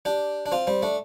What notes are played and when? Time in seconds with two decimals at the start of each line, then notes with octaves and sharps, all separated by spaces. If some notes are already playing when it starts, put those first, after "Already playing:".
0.05 D4 G4
0.46 D4
0.52 C4 F4
0.67 G3 C4
0.82 A3 D4